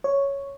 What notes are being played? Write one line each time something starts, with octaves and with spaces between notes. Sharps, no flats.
C#5